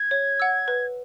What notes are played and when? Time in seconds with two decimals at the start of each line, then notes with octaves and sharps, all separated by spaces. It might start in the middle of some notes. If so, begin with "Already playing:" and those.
Already playing: G#6
0.11 C#5
0.40 F#5 E6
0.68 B4